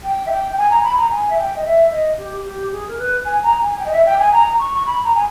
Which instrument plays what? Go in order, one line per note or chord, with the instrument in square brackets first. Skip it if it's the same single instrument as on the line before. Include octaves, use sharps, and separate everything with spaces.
[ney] G5
E5
G5
G5
G#5
A#5
B5
A#5
G#5
E5
G5
D#5
E5
D#5
G4
G4
G#4
A#4
B4
G#5
A#5
G#5
G5
D#5
E5
G5
G#5
A#5
C#6
C#6
B5
A#5
G#5